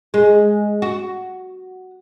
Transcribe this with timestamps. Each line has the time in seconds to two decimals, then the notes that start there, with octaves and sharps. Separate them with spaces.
0.14 G#3
0.82 F#4